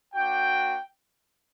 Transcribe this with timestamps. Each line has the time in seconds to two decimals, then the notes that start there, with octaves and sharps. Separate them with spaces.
0.15 A#3 D4 F#4 G5